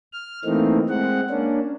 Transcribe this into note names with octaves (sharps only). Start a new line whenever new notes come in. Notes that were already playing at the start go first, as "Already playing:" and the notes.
F6
E3 A3 A#3 C4 D#4
G#3 C4 F#5
A#3 C#4 D4